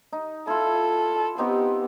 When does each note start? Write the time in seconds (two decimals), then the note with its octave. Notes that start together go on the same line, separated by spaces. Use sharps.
0.12 D#4
0.47 E4 F4 A4
1.38 B3 C4 D#4 G4